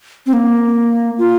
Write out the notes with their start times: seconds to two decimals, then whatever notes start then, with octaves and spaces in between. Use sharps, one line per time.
0.26 C4
0.33 A#3
1.18 F4